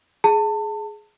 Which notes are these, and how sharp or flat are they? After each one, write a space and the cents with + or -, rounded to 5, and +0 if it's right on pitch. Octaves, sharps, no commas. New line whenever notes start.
G#4 +15 A5 +25